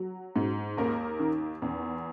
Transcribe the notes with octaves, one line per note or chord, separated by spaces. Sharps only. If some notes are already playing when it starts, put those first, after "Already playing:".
Already playing: F#3
G#2
D#2 A#3 A#4
D#3
E2